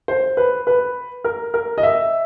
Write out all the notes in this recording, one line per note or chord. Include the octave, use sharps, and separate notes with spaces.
C5
B4
B4
A#4
A#4
D#5
E5